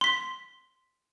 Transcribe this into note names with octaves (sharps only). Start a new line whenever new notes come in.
C6 B6